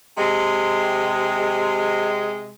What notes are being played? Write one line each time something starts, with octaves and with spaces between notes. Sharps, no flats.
C3 G#3